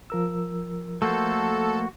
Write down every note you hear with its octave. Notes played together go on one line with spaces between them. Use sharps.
F3 A#4 E6
A3 A#3 F#4 A4 C5